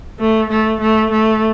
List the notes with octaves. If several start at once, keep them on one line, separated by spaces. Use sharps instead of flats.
A3
A3
A3
A3